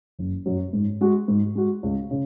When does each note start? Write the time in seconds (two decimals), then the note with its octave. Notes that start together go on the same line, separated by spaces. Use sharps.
0.19 F#1
0.46 F#2 F#3
0.73 G#2
1.01 G#3 F#4
1.28 G#2
1.55 G#3 F#4
1.83 C#2
2.11 C#3